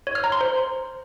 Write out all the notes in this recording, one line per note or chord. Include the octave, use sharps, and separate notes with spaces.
C#5
F6
A#5
C6
C5